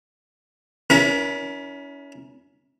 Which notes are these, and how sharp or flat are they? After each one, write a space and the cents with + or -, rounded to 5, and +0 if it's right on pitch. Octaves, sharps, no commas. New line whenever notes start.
C#4 +30 E4 -20 A#4 +30